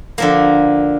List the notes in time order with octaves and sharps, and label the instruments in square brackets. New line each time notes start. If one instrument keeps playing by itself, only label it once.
[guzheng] D3 F3 A#3